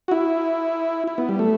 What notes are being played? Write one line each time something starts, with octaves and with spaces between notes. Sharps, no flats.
F#4
E4
E4
B3
G3
A3